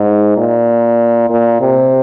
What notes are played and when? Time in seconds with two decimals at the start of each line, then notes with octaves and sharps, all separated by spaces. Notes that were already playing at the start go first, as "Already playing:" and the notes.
Already playing: G#2
0.37 A#2
1.30 A#2
1.61 C3